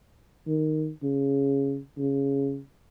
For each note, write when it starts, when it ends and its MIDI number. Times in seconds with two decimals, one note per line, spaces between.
0.47 0.89 51
1.03 1.78 49
1.98 2.58 49